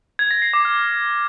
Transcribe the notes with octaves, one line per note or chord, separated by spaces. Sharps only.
G#6
A#6
C7
D6
F6